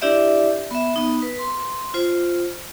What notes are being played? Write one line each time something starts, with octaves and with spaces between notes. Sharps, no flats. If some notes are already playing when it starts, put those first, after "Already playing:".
D4 E4 G4 D5 E5
B3 E5
B3 D#4
B4
C6
F4 C5